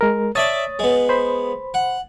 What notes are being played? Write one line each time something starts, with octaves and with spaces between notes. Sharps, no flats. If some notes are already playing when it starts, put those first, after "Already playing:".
G#3 A#4
C#5 D5 E5 A5 D#6 A6
G#3 B3
C5 B5
F#5